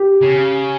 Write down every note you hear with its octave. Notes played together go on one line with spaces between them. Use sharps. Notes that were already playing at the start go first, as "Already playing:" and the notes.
Already playing: G4
C#3